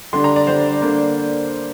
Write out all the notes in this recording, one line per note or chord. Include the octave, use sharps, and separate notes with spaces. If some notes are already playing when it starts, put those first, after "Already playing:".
D3 G3 D4 C6
A#5
D5
D3 G3 D4 C5
D3 A#3 D4